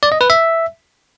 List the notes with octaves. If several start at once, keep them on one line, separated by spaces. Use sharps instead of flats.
D5
D#5
B4
E5